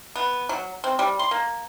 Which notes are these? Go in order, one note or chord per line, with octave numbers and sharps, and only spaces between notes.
B3
F#3
C4
G3
C6
A#3